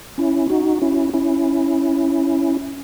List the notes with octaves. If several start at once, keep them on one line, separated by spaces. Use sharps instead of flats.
C#4 E4
D#4 F#4
C#4 E4
C#4 E4